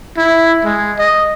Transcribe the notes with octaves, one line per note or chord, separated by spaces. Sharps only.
E4
G#3
D#5